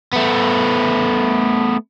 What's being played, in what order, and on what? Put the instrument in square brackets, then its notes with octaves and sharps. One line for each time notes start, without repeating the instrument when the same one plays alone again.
[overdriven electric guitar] A3 B3